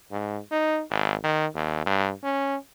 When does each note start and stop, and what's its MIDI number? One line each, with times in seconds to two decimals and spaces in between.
0.11 0.38 44
0.51 0.81 63
0.90 1.15 32
1.24 1.46 51
1.55 1.83 39
1.86 2.11 43
2.23 2.56 61